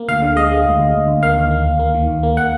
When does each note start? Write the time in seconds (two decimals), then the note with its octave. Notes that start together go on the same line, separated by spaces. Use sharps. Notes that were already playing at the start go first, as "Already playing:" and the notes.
Already playing: A#3
0.09 D2 F5
0.22 D3
0.36 G#3 D#5
0.51 G#3
0.66 D2
0.79 D2
0.93 D2
1.08 D2
1.23 A#3 F5
1.37 D#2
1.51 A#3
1.65 D#2
1.79 A#3
1.94 D#3
2.08 D#2
2.23 A#3
2.37 A#3 F#5